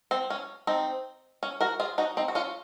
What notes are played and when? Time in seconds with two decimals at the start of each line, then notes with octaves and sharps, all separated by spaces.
0.11 C4
0.30 C#4
0.67 C4 D#4
1.43 C#4
1.61 F#4 A#4
1.80 F4 G#4
1.98 D#4 F#4
2.17 C4 D#4
2.28 F#4
2.35 C#4 F4